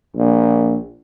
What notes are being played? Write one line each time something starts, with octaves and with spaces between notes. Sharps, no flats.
A#1